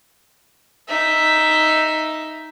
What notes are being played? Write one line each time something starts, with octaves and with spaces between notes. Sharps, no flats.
D#4 E5